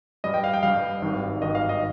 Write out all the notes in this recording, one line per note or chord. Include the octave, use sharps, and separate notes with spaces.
G2 G3 D#5
G5
F5
G5
G2 G3 F5
G#1 G2 D#3
G#1 G2 D#3 D#5
F5
D#5